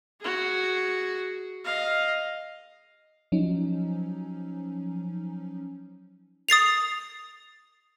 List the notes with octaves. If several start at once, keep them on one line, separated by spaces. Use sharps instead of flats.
F#4 G#4
D#5 F5
F3 F#3 C#4 D#4
D#6 A6 C7 F7